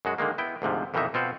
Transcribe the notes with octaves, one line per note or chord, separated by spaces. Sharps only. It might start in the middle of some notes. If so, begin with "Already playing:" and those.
F#2 G#3 F#4
D3 D#3 G#3 A#3
B3 E4 G5
D2 G#2 C3 F3
F2 B2 D#3 E3 D#4 E5
B2 C4 F4 C5 F#5